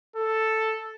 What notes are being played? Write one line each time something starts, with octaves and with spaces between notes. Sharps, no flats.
A4